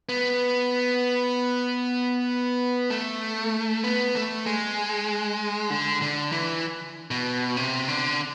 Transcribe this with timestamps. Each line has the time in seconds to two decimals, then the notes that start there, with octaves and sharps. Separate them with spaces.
0.09 B3
2.90 A3
3.84 B3
4.15 A3
4.46 G#3
5.70 D3
6.02 D3
6.32 E3
7.11 B2
7.57 C3
7.88 D3